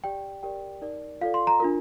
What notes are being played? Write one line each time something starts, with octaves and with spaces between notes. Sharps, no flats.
G4 D5 G5
G4 A#4 D5 G5
D#4 A#4 D5
F4 A4 D5 F5
C6
A#5
D4 F4 A#4